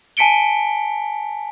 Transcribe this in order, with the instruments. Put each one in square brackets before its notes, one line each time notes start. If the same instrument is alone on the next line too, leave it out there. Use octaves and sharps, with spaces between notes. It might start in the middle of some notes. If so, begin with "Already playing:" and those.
[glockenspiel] G#5 A5 B6 C#7 D7 G7